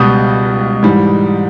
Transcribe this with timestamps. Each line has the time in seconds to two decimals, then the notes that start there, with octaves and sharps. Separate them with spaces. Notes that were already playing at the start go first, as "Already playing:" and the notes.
Already playing: C#2 B2 G3 D#6 G6
0.83 G#2 E3 G3